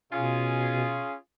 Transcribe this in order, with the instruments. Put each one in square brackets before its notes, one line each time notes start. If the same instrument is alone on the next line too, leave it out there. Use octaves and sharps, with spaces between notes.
[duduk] B2 [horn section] C#4 F4 G#4